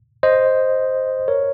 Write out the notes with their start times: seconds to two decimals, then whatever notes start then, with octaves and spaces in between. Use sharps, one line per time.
0.23 C5 D#5
1.28 A#4 C#5